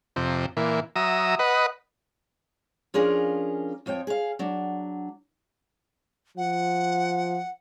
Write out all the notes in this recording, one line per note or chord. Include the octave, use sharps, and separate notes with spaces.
F2 C3
A#2 E3
F#3 E5 A#5 D#6
B4 D#5 F#5
F3 C#4 D4 F4 G#4 A#4
F2 F3 C#5 G5
G#4 F5
F#3 D4
F3 F#5